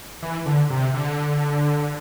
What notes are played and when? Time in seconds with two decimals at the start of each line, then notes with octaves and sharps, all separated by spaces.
0.22 E3
0.46 D3
0.70 C3
0.94 D3